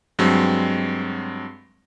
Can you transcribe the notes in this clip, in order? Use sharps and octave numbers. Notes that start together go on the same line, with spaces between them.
G2 F#3 G#3 C4